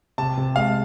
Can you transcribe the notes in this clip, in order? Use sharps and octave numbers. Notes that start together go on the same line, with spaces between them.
C3 A5
C3
G#3 F5